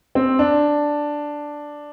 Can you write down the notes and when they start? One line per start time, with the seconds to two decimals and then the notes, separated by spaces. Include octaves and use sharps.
0.15 C4
0.39 D4